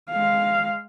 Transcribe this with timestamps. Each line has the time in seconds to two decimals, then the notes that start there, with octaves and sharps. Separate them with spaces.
0.11 G#3 F5